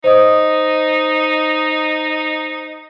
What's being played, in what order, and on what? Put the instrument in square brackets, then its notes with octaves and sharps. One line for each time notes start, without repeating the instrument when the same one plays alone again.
[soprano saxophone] D#4 [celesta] C5 D#5 D#6